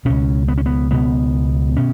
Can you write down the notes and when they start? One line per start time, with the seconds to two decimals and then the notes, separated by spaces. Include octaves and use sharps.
0.05 C#2 B2 C#4
0.48 B3
0.57 C#4
0.66 B3
0.90 C#2 B2 B3
1.77 B2 C#4